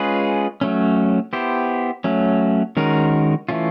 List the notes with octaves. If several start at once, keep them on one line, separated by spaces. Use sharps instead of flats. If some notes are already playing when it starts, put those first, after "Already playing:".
Already playing: G#3 C#4 F4 G#4 B4
F#3 A3 C#4
B3 E4 G4 C5
F#3 A3 C#4
D#3 G#3 C#4 F#4 A#4
E3 A3 C#4 F4